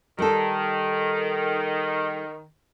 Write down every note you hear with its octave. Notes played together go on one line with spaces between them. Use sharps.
D#3 G3 A4